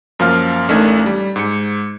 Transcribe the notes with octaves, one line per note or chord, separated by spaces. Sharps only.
F#2 F3 A#3 F5 F6
A1 A3 D4 D#4 A#4 G#6
G3
G#2 C#7